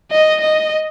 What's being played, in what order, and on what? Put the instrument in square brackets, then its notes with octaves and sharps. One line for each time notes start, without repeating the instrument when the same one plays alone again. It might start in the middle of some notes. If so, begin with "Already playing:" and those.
[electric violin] D#5
D#5